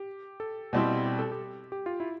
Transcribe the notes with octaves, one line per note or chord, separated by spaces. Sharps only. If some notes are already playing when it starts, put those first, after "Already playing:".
Already playing: G4
A4
B2 G3 C4 E4
G4
A4
G4
G4
F4
E4